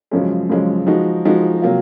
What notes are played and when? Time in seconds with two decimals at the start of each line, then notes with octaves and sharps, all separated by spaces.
0.11 F#2 C#3 F3 G#3 C#4
0.50 F#2 C#3 F3 G#3 C#4
0.87 F3 G#3 D#4 F#4
1.25 F3 G#3 D#4 F#4
1.62 C3 F#3 A#3 F4